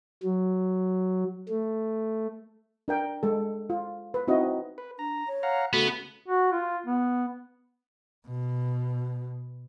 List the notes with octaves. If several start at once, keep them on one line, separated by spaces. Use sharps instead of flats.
F#3
A3
D4 A#4 G5
G#3 A4
F4
B4
C4 D#4 E4 F#4 D#5
B4
D4 A#5
C#5
F5 F#5 A#5
C#3 A3 B3 F#4 B5
F#4
F4
B3
B2